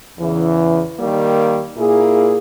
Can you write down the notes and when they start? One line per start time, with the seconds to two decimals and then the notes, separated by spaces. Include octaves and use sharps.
0.19 E2 C#3 E3
0.98 D#3 G3 A#3
1.77 A#2 A#3 E4 G#4